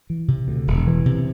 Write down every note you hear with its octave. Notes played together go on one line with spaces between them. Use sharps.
E3
C3
D2
E1
E3
C3